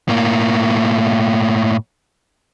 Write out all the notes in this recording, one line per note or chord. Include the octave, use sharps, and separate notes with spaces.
A2 A#3